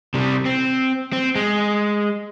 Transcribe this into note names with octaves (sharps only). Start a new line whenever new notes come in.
C3 G3
C4
C4
G#3